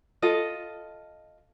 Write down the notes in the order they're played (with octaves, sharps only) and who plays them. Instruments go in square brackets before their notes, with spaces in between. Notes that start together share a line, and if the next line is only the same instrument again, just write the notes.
[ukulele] F4 A4 D#5